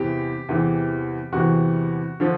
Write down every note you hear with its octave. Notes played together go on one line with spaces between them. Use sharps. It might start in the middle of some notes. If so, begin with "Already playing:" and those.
Already playing: E2 C3 E3 G4
E2 C3 E3
E2 C3 E3 F#4
D3 F3